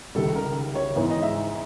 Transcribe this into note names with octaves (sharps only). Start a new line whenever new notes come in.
C#2 C3 D#3 G3 A4
A#4
C#5
G#2 E3 G#3 B3 D#4
D#5
E5